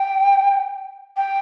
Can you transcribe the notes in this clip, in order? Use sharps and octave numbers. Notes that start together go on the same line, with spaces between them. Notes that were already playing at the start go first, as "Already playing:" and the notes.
Already playing: G5
G5